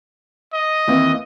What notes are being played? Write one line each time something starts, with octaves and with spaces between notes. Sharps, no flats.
D#5
D#2 E3 C4